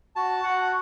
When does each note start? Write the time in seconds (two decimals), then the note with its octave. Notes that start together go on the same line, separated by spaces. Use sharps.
0.16 F#4 A5
0.43 F#4 F#5